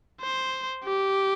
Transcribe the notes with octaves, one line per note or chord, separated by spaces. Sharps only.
C5
G4